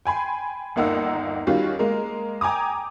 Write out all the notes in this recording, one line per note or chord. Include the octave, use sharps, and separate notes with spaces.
G5 G#5 B5 C6
G1 D#2 A#3 D#4 F#5 E6
D#3 G3 C#4 F4 F#4
G#3 A#3 A#4
G5 G#5 A#5 D6 D#6